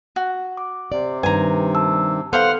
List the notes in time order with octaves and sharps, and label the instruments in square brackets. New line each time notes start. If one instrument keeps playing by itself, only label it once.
[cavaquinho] F#4
[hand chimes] D6
[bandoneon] C3 [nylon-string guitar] D5
[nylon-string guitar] G2 D#3 [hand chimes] B4 [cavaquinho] G#5 A#5
[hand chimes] A5 E6
[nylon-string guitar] B3 [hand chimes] A4 [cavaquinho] C5 F5 C6 [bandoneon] F#5 F6